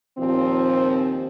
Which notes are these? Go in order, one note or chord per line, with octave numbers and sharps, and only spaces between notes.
D#2 A#2 F3 C4